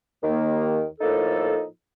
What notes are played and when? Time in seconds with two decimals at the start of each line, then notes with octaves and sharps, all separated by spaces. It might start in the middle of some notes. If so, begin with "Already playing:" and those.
0.22 D#2 D#3 A#3
1.01 A2 F3 A#3 D#4 A4